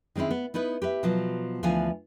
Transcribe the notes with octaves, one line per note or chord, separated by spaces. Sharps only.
D#3 G#3 C4 C#4 E4
B3
B3 D#4 E4 B4
G4 B4 E5
B2 F3 F#3
D2 E3 F3 B3 F5 G#5